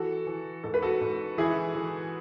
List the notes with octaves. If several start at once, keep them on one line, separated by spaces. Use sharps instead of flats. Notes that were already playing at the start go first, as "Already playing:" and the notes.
Already playing: E3 F#4 A4
E3
G#2 A4
B4
F#4 A4
G#2
E3 E4 G#4
E3